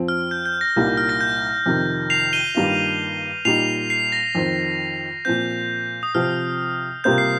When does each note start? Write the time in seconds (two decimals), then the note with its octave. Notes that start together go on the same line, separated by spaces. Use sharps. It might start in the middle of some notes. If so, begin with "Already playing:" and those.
Already playing: F2 F3 C4
0.08 F6
0.31 G6
0.46 G6
0.61 A#6
0.76 C2 A#2 G3 A#3 D#4
0.97 F6
1.09 A#6
1.21 G6
1.66 F2 C3 D#3
2.10 C7 F7
2.33 D#7 G7
2.55 G2 D#3 G3 A#3 F4
3.45 A#2 G3 D#4 C7 F7
3.90 C7
4.12 A#6
4.35 F2 D#3 C4
5.25 A#2 F3 C4 G6
6.03 D#6
6.15 C3 F3 C4 F6
7.04 C3 G3 A#3 F4 C5 G6
7.18 C7